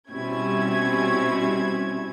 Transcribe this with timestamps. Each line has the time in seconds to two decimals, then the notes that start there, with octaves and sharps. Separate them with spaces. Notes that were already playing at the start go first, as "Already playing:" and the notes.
0.11 B2 G3 C4 C#4 E4 G#6